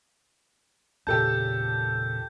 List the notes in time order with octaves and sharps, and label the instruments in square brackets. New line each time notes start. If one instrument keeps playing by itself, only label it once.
[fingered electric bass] E2 A#2 C#3 [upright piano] G4 A4 A5 [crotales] G6